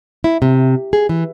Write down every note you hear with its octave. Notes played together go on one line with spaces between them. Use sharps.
E4
C3
G#4
E3